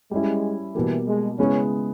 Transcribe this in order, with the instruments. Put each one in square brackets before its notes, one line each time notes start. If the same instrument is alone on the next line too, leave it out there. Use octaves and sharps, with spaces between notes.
[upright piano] G3 C#4 E4 [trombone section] G#3
[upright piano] B2 G3 A#3 [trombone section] E3
[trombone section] G#3
[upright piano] C#3 G#3 B3 E4 [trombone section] C#4